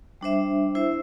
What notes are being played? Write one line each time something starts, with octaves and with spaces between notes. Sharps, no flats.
G3 D4 C5 E5
E4 C5 E5